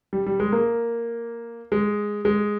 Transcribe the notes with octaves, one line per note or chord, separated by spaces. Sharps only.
G3
G3
G#3
A#3
G#3
G#3